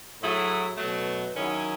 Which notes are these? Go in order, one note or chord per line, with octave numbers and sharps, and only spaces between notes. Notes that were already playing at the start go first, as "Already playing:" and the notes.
A2 F#3 A3 E4 G#4
B2 F#3 A3
D#3 F#3 C#4 E4 G#4